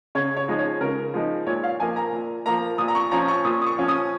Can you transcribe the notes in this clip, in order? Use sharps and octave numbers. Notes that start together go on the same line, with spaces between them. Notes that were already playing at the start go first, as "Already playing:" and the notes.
C#3 C#5
C#5
F3 G#3 D#4
C#5
C#3 A#4
F3 G#3 D#4
A#2 C#5
F5
F3 A#3 G#5
A#5
A#2
F3 A#3 A#5
A#2 D#6
A#5
C#6
F3 C#4 A#5
C#6
A#2 D#6
D#6
C#6
F3 C#4
D#6